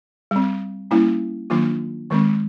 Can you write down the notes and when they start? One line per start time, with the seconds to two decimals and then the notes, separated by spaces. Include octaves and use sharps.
0.31 G3 C4
0.91 G3 A#3 C#4 E4
1.50 D#3 F#3 A#3 D4 F4
2.10 D#3 G#3 C4